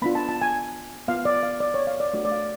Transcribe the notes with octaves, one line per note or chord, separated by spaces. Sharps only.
B3 D4 F4 B5
A5
A5
G#5
B3 F4 F5
D5
F5
D5
C#5
F5
D5
A3 D4 F#4 D5
D5
F5